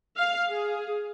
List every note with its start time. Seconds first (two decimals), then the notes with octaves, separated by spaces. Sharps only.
0.17 F5
0.48 G#4